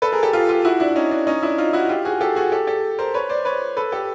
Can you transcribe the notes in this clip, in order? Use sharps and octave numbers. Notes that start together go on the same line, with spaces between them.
A4 B4
G#4 A#4
G4 A4
F4 G4
F4 G4
E4 F#4
D4 E4
C#4 D#4
D4
C#4 D#4
D4 E4
D#4 F4
E4 F#4
F4 G4
F#4 G#4
G4 A4
F#4 G#4
G4 A4
G4 A4
A#4 C5
B4 C#5
C5 D5
B4 C#5
A4 B4
G4 A4